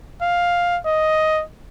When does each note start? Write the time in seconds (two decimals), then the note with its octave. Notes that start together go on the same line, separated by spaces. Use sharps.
0.21 F5
0.86 D#5